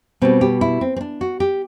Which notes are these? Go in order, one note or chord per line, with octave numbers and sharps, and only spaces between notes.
B2 G3 B3 C4
G4
E4
C4
C4
D4
F#4
G4